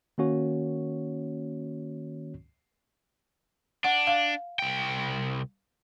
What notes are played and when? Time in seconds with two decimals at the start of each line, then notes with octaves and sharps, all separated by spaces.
0.18 D#3 A#3 C#4 F#4 C#5
3.84 D4 F#5
4.07 F5
4.59 C2 G5